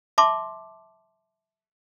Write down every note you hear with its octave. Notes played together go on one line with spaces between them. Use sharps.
E5 A5 C6 D6